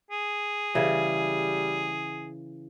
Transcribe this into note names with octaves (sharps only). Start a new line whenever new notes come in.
G#4
C#3 E3 G3